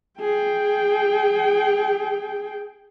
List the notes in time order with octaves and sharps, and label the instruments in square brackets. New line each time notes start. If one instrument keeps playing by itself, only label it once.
[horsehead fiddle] G#4 G5